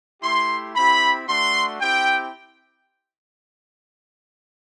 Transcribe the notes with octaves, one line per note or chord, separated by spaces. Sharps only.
A3 E4 G4 C6
C4 E4 G4 B5
A3 D4 F#4 C6
C4 E4 G4 G5